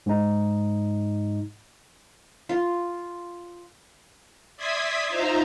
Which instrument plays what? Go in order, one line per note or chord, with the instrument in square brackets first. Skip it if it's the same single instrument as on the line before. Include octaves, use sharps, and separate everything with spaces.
[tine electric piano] G#2 D#4
[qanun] F4
[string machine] D5 E5 C6 D#6 G#6 B6
D#4 F4 C5 E5 F5 A#5